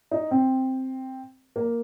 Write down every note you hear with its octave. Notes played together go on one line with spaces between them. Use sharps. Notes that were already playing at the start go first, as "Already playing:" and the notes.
D#4
C4
A#3